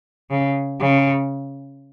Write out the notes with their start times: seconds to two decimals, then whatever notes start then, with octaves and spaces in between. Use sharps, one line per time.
0.31 C#3
0.80 C#3